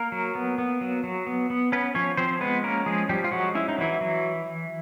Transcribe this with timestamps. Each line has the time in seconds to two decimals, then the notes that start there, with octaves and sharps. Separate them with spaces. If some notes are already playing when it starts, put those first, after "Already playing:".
Already playing: A#3 A#4
0.12 F#3
0.35 B3
0.58 B3
0.81 F#3
1.04 F#3
1.27 B3
1.50 B3
1.72 B3 C#4 B4
1.95 F3 C#4 C#5
2.17 F3 C4 C5
2.40 G#3 B3 B4
2.64 A#3 C#4 A#4
2.86 F3 G#3 G#4
3.09 F3 G3 G4
3.24 F4
3.32 F#3 G#3 F#4
3.55 C#4 E4
3.68 D#4
3.78 E3 F#3 E4
4.01 F#3